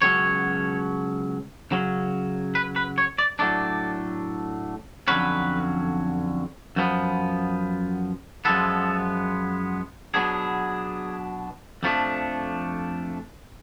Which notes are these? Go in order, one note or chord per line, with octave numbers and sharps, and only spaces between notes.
C#2 B2 F#3 C#4 C#5
C#3 F#3 C#4
B4
B4
C#5
D5
A2 F#3 A3 D4 D5
F2 D3 F#3 C#4 B4
F#2 F3 B3
F#2 F3 G#3 B3 A4
B2 F#3 B3 D4 G#4
F2 F3 A3 D4